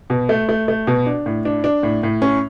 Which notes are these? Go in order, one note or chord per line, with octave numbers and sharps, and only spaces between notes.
B2
A3
A3
A3
B2
D4
A2
D4
D4
A2
A2
C#4